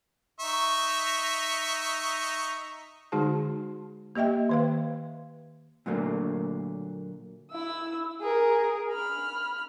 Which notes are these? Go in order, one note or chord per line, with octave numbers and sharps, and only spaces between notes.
D#4 E5 C#6
D3 G#3 D#4 F#4 G#4 A5
A#3 G4 D#5 E5 G5
D#3 B4 F5
A#2 D3 F#3 A3 A#3
E4 E6
G#4 A#4
B5 F6